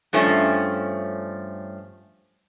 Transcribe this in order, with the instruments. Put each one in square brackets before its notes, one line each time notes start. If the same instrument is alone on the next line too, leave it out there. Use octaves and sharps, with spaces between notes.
[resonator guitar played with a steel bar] G2 F3 A3 C#4